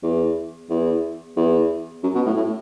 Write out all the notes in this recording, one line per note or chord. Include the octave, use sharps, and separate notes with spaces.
E2
E2
E2
F#2
B2
A2
A2